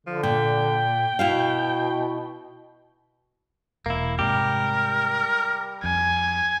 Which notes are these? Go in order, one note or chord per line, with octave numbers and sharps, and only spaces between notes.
D3 F3
A#2 G5
B2 E4 F#4 F5
E1 A#3 E4
G#2 C3 G3 G4 A#4
F2 G#5